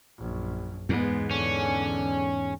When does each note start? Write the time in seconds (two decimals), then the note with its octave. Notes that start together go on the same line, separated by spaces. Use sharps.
0.18 A#1 F#2
0.89 E2 G#2 G#3 B3
1.31 D3 E3 C#4